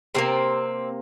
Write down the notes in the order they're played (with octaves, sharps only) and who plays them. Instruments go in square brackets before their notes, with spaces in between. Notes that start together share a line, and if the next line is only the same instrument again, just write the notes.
[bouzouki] C3 F3 A#3 C4